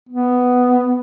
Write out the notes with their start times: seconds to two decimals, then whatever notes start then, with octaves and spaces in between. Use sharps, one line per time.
0.09 B3